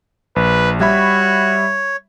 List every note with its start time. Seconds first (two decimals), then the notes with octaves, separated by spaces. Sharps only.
0.36 A#1 B4
0.80 G3 F#4 C#5 E5 B5